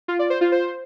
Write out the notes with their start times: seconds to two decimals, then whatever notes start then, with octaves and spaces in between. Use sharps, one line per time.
0.08 F4
0.19 D5
0.30 C5
0.41 F4
0.52 C5